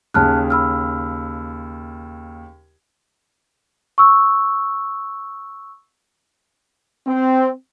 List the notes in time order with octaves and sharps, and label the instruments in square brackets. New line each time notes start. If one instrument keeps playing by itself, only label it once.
[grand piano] D#2 C#3 [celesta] A5 F6 F#6
[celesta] B5 E6 F6
C#6 E6
[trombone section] C4